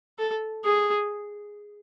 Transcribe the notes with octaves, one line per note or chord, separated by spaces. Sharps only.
A4
G#4